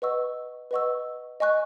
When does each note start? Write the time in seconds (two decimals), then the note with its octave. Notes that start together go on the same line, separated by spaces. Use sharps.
0.02 B4 D#5 F#5 C#6 E6
0.71 B4 D#5 F#5 C#6 E6
1.40 D#5 G#5 C#6 F#6